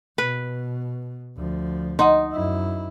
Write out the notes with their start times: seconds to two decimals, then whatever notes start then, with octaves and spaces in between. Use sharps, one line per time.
0.18 B2 B4
1.37 D2 F3
1.99 D#4 D#5 F#5 C6
2.33 F#2 E4